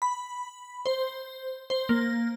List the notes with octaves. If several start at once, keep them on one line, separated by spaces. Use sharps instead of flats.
B5
C5
C5
A#3